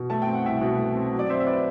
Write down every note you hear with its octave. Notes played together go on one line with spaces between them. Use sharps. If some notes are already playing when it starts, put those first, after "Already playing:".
Already playing: B2
A3 A5
G5
C4
F#5
C2 E5 G5
B2
A3
C4
F#3
D5
C4 C5 E5
E5
B4 D5